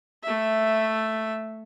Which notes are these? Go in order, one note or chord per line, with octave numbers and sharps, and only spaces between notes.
A3 E5